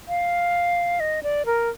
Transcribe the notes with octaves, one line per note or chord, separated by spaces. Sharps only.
F5
D#5
D5
A#4